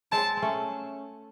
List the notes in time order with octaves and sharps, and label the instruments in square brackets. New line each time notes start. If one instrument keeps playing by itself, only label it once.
[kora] G#3 C4 [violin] A5
[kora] C4
A3 C#4